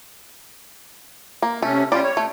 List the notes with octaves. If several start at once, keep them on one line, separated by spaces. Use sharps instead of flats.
A#3
C3 A3 C#4
G3 C#4 F4 D5
C#5
A3